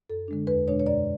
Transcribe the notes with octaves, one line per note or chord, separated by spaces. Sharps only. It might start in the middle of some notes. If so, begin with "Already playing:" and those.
F#2 A4
D3 G#3 D4
E2 B4
B2 G#3 D4 C#5
C#5
F#2 D5